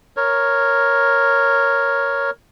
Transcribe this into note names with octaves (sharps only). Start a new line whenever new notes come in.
A#4 C#5